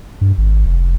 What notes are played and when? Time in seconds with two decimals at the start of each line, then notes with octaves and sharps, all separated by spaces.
0.21 G2
0.38 G#1
0.66 F1